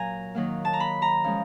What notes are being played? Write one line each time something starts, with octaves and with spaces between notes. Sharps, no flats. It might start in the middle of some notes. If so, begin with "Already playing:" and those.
Already playing: A#2 F#3 G#5 A#5
D#3 F#3 A#3
A5
A#5
B5
A#5
F3 G#3 C#4